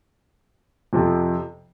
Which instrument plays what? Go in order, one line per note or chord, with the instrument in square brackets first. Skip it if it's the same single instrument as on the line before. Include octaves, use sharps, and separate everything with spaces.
[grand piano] F2 C3 F3